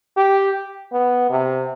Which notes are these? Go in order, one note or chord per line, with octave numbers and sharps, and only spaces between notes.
G4
B3
C3